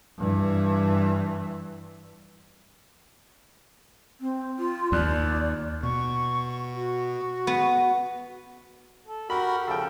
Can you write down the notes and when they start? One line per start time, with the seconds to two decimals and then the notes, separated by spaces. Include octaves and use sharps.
0.18 G2 E3
4.21 C4
4.59 F4
4.92 D#2 D5
5.83 B2 C#6
6.75 F#4
7.47 B3
9.07 A4
9.30 F#4 G4 A#4 B5
9.68 C#3 F3 A4 G5